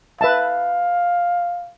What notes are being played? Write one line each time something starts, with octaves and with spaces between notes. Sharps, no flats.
B4 E5 F5 A5